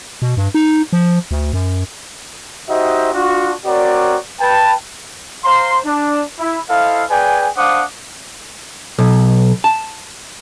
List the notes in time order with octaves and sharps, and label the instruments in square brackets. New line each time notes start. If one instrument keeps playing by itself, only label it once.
[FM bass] B2
G2
D#4
F3
D2
F#2
[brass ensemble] D#4 F#4 G4 C5 D#5 E5
D4 F4 F#4
C4 F#4 A#4 C#5 D5
B4 G5 A5
[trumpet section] C5 F5 A#5 C6
D4
E4
E4 A4 C5 D#5 F5
G#4 B4 D5 G5 G#5
D4 C5 F5 F#5 D6 D#6
[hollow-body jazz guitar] B1
A5